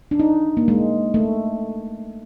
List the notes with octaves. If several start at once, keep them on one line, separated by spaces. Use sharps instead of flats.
D4
D#4
A#3
G#3
A3